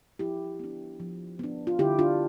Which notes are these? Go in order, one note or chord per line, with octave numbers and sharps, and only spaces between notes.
F3 E4 G4
B3 D4
F3
B3 D4
F4
D3 E4 G4
D4 F4